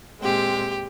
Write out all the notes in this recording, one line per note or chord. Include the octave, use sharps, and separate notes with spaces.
A#2 G#3 C4 G4